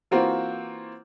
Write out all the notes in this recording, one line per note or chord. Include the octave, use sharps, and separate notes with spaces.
E3 A#3 C4 F4 F#4